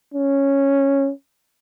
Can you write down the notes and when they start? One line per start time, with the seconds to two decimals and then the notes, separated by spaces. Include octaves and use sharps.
0.14 C#4